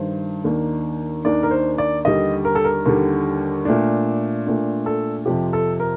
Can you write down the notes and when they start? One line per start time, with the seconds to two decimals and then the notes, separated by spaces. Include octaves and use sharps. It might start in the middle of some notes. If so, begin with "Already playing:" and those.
Already playing: G2 D#3 G3 C5
0.44 D#2 D#3 A#3 D4
1.25 D#2 D#3 A#3 D4 D5
1.43 A#4
1.51 C5
1.78 D5
2.05 D#2 D3 G3 D#5
2.45 A#4
2.55 A4
2.64 A#4
2.86 D#2 D3 G3
3.65 A#2 A3 D4
4.46 A#2 A3 D4
4.86 A4
5.26 F2 C3 F3 G4
5.53 A4
5.80 A#4